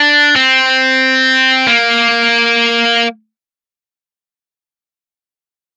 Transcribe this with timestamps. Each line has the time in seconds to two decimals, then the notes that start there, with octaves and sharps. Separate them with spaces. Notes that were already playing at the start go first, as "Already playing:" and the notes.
Already playing: D4
0.36 C4
1.67 A#3